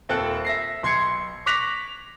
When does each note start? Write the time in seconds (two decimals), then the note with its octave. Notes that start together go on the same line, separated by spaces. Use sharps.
0.09 D#1 C4 A4 G5 F#6
0.45 E5 A#6 C7
0.83 B1 C6 G#6 C7 C#7
1.46 C#6 D6 F#6 A#6 B6 F7